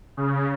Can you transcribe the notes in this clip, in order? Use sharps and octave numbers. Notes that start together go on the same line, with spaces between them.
C#3